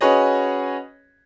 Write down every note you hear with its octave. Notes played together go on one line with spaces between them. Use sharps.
C#4 F#4 G#4 B4 C#5 D#5